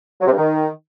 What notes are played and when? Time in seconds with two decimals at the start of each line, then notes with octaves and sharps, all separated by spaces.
0.21 F#3
0.26 C3
0.31 G2
0.37 D#3